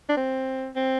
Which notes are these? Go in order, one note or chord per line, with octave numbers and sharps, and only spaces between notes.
D4
C4
C4